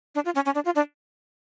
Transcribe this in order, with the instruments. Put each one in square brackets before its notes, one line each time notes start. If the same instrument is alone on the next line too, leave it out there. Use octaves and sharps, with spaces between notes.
[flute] D4
F4
C#4
C#4
D4
F4
D4